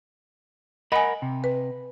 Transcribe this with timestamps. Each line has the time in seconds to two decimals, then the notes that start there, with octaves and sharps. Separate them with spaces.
0.92 A#4 D#5 F#5 G#5 B5
1.22 C3
1.44 B4